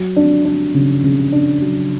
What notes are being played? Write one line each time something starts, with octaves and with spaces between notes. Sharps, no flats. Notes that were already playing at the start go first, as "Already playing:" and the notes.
Already playing: F#3
D4
D4
C#3
C#3
D4
F#3